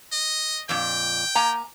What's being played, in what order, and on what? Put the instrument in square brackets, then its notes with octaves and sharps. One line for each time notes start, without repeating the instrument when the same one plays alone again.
[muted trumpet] D#5
[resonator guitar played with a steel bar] F2 A#2 [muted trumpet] G5
[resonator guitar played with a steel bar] A#3 G#5 A#5